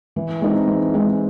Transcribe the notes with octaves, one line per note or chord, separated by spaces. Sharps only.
E3
G#3 C4 D#4
E3
G#3 C4 D#4